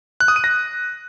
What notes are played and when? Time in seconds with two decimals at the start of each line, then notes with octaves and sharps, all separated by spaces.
0.20 F#6
0.28 D#6
0.36 D#7
0.44 A#6